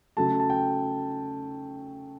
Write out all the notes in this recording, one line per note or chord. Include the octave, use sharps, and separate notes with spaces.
C#3 F#3 A3 A5
A5
G5